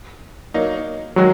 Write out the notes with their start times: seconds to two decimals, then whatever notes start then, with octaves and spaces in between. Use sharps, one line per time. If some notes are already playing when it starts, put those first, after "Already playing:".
0.54 F#3 A#3 D#4
1.16 D#3 F#3 G#3 F#4